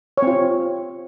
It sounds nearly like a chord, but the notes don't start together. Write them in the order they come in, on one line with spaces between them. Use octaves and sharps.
C#5 C4 F4